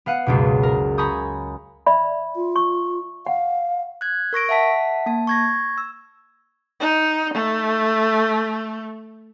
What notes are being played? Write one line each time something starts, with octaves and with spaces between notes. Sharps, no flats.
B3 F5 F#5 D#7
F#1 C#2 B2
A#4
G#5 A#5 B5 C#6 D#6 G6
D5 E5 B5
F4
C#6
F5 F#5
F#6 G#6
A#4 C#6 A#6 D7
E5 F#5 A5 B6
A#3 A5
C#6 G#6 A#6
E6
D#4
A3